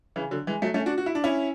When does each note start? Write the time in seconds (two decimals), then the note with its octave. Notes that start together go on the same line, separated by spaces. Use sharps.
0.16 C#3 E3
0.31 D3 F#3
0.47 E3 G#3
0.62 F#3 A3
0.74 A3 C#4
0.86 D4 F#4
0.98 F#4
1.06 E4
1.15 D4
1.24 C#4 E4